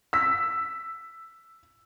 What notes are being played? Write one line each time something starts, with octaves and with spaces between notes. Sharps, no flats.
E6 B6